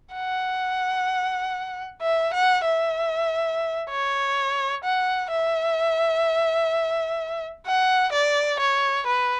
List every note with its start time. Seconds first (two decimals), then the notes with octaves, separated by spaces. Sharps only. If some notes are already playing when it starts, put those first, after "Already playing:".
0.14 F#5
2.02 E5
2.34 F#5
2.65 E5
3.90 C#5
4.84 F#5
5.31 E5
7.67 F#5
8.13 D5
8.60 C#5
9.07 B4